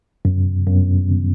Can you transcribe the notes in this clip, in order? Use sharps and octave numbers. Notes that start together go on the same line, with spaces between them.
F#2
F#2